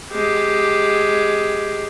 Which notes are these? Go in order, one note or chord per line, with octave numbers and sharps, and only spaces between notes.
G#3 G4